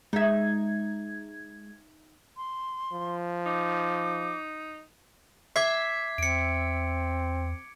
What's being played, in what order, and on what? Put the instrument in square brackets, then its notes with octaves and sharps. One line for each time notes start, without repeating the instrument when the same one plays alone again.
[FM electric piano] G#3 G#6 [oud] D#4 E5
[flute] C6
[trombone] F3
[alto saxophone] D#4 [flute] D6
[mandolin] E5 [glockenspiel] D6 G#6 C7
[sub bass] E2 [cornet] C4 [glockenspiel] C#7 D7